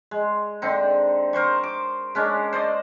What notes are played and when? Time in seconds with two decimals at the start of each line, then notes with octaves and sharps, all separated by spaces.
0.11 G#3
0.62 D3 C4 D#4
1.33 A#4 C5 C6 C#6
1.64 D6
2.15 G#3 C#4 D4
2.53 C5 D5 D#5